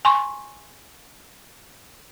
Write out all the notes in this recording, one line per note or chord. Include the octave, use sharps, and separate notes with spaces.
G#5 C6 C#6